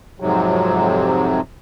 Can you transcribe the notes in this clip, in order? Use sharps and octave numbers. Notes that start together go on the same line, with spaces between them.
F2 G#2 C3 F#3